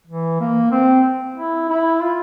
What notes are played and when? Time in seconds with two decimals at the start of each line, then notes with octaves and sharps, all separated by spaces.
0.07 E3
0.40 A#3
0.72 C4
1.36 E4
1.69 E4
2.01 F4